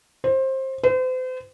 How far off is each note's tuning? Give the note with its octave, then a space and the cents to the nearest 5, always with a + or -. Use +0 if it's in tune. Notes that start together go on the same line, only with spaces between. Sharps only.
C5 +20
C5 -40